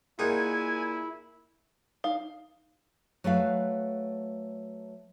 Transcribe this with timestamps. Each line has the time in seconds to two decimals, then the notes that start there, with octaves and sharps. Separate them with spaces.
0.19 A#2 A#3 D#4 E4 G#4 F#5 G#5
2.04 D#4 F5
3.24 F#3 A3 B4 F5